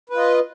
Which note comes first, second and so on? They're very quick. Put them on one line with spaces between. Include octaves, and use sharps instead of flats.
B4 F4 D#5